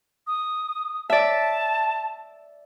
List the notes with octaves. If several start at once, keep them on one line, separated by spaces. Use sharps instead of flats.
D#6
D5 E5 A5